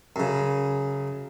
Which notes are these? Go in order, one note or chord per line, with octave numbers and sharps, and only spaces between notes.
F#2 C#3